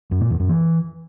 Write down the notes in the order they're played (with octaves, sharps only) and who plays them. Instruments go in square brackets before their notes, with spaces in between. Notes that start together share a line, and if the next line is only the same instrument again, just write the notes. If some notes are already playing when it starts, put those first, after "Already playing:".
[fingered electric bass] F#2
A#2
E2
F#2
E3